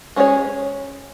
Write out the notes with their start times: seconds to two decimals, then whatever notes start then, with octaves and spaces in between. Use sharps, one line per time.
0.16 G#3 C#4 E4 G#4 C#5